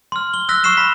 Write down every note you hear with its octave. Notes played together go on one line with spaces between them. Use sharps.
C6 F6
G7
E6 F#6 A#6 B6 G7
C#6 F6 C7 E7 G7
B5 B6